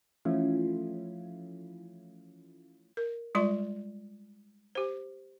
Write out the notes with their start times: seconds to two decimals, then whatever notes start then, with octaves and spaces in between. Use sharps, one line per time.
0.25 E3 F3 A3 C#4 E4 F4
2.97 A#4
3.35 G3 G#3 F4 D5 C6
4.75 G4 C5